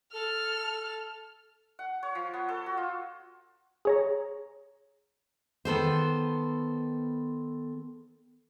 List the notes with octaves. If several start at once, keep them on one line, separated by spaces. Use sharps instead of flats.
A4 F6
A4
F#5
C#5
F3
B3
A4
F#4
F4
G#4 C#5 A#5
D#3 B3 A4 C5